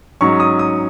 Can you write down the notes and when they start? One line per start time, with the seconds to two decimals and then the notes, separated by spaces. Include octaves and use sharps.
0.21 G#2 F#3 C#4 C#6
0.40 D#6
0.59 D#6